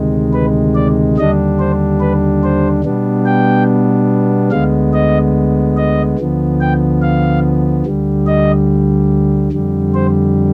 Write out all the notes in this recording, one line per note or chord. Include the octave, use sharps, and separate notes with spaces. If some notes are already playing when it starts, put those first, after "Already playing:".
Already playing: D2 C3 D#3 G#3
B4
D5
D#2 D3 G3 D4 D#5
C5
B4
C5
B2 G3 B3 D4
G5
D2 D3 G#3 B3 F5
D#5
D#5
D2 D3 F3 B3
G5
F5
D2 D3 G3
D#5
F2 D3 G3
C5